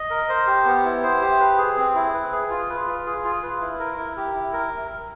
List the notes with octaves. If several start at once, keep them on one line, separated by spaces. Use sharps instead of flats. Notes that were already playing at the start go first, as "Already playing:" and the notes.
Already playing: D#5
A#4
C5
G4
B3
E4
C5
G4
B4
G#4
C4
E4
B4
G#4
F4
B4
F4
G#4
F4
B4
E4
A#4
E4
G4
E4
A#4